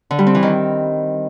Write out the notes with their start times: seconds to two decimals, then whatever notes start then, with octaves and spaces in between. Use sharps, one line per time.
0.11 D3
0.19 G3
0.27 C4
0.35 E3
0.43 D#3